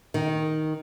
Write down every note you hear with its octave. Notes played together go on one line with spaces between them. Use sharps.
D#3